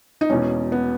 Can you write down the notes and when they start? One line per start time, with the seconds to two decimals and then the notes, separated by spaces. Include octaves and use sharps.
0.21 D#4
0.30 E1 E2 B2 C#4
0.72 B3